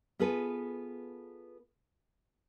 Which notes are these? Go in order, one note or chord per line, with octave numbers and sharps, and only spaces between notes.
B3 F4 G#4 A4 B4